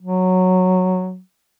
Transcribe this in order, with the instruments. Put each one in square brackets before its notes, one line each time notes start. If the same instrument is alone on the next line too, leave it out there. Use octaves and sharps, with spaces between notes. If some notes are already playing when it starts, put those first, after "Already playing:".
[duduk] F#3